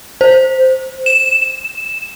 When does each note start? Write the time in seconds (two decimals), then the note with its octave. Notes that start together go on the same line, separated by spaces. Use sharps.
0.21 C5
1.06 E7